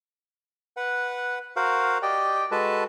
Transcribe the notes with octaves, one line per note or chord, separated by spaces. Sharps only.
B4 F#5
F#4 A#4 C5 F5 F#5
G4 D5 D#5 G5
G#3 F#4 A4 B4 A5